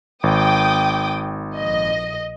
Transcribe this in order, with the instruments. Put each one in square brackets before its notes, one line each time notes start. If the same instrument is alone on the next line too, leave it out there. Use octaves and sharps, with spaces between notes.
[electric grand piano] G#1 [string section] G5 D6 D#6
[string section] A#1 D#5